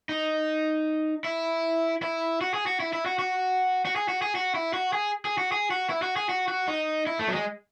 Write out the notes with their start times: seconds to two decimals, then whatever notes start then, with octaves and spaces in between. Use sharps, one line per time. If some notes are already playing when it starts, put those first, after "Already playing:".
0.09 D#4
1.24 E4
2.03 E4
2.41 F#4
2.54 G#4
2.67 F#4
2.80 E4
2.93 E4
3.06 F#4
3.19 F#4
3.86 F#4
3.96 G#4
4.09 F#4
4.22 G#4
4.35 F#4
4.55 E4
4.74 F#4
4.93 G#4
5.25 G#4
5.38 F#4
5.52 G#4
5.71 F#4
5.90 E4
6.02 F#4
6.17 G#4
6.29 F#4
6.48 F#4
6.68 D#4
7.07 E4
7.19 A3
7.28 F#3
7.32 G#3